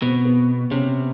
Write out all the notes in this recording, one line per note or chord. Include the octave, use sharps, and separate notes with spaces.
B2 C4
B3
C3 C#4